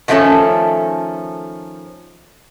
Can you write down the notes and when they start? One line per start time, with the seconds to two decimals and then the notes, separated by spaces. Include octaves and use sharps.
0.08 D#3 F3 A3 A#3 C#4 A4